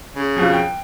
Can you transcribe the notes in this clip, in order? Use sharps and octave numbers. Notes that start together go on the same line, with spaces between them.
C#3
F2 B2 F3
G5